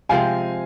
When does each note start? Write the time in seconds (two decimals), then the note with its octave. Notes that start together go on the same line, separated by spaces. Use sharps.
0.09 C3 F3 G#3 C4 F5 G#5